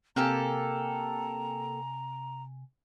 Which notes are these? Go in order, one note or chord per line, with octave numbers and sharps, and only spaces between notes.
C3 A#3 G4 A4 G#5 A#5